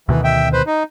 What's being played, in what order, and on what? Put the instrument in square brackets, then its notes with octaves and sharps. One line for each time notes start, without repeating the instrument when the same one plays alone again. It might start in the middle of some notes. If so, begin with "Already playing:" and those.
[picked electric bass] D2 B2 D#3 [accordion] E3
[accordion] E5 G5
B4 C5
D#4